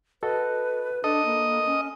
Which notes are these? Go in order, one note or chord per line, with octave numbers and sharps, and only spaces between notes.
F#4 A4 B4 D#5
D4 A4 D#5
A#3
C#4